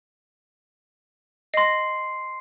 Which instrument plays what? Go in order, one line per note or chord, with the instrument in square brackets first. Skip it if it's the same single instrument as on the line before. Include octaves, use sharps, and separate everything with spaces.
[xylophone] D#5 A#6 [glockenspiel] C6 C7